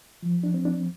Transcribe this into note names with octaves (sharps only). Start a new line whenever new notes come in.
F3
D4
C4
D4